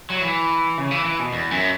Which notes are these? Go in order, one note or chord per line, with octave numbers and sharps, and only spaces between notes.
F#3
E3
C#3
E3
E3
B2
E2
F#2